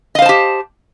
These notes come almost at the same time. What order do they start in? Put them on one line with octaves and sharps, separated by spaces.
D#5 F5 C5 A5 G4